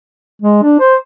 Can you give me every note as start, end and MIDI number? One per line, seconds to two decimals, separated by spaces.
0.42 0.59 56
0.63 0.78 62
0.80 0.96 72